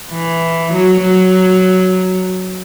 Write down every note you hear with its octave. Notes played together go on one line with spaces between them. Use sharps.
E3
F#3
F#3